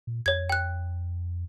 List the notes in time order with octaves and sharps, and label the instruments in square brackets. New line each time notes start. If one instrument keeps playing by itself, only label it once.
[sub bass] A#2
[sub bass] F2 [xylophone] C#5 G#6
[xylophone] G5 F#6